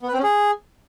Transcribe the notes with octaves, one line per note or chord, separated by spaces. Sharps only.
B3
B4
C4
C#4
G#4